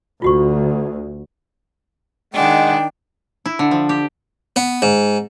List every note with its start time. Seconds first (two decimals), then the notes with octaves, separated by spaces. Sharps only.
0.22 D2 F4 F#4 C#6
2.34 D#3 G#3 D4 F#5 G5
3.46 E4
3.59 D3
3.71 F3
3.89 G4
4.56 B3
4.82 G#2